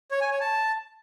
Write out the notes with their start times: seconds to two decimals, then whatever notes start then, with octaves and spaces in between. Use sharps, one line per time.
0.11 C#5
0.21 G#5
0.31 C#5
0.41 A5